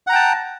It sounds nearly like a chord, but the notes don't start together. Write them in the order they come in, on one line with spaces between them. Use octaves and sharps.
F#5 A#5 G5 A5